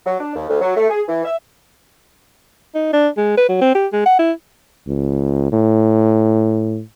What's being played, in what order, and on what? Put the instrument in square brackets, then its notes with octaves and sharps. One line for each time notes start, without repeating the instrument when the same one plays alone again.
[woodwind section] F#3
D4
D#2
D2
F#3
A3
G#4
E3
E5
[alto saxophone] D#4
D4
G#3
B4
F#3
C4
G4
G#3
F#5
E4
[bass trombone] C#2
A2